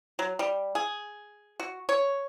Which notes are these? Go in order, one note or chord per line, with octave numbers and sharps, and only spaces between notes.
F#3
G3
G#4
F#4
C#5